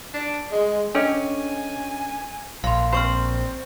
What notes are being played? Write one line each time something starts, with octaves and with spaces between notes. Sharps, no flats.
D4
G#3
C#4 D4 A4 D#5 G#5
A#1 F5 C6
C4 C5 C6 C#6 F6